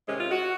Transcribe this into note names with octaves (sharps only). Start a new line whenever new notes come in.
C3 D#3 G#3 C#4
F4
F#4